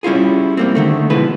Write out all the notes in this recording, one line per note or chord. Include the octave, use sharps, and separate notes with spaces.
G3 C#4 E4 F4 G#4
G3 A#3 C4
D3 D#3 A3
B2 F3 G#3 E4 B4